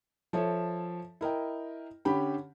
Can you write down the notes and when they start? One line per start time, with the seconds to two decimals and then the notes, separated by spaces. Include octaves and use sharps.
0.33 F3 A4 C#5 E5
1.21 E4 A#4 D#5 G5
2.05 D3 C#4 G4 G5 B5